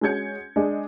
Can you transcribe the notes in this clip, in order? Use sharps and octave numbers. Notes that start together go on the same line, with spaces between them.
G#3 C#4 F#4 G6 G#6 C#7
G#3 D4 D#5